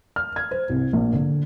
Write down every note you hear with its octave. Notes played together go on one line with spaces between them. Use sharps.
F6
G#6
C5
C2
A#1
D3